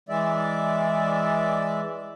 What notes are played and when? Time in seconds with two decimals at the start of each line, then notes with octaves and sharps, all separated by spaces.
0.09 E3 G#3 D5 E5